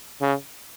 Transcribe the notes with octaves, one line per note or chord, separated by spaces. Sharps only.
C#3